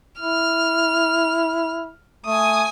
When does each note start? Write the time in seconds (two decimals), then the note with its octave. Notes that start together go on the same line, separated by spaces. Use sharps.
0.20 E4 F6
2.26 A3 G#5 D#6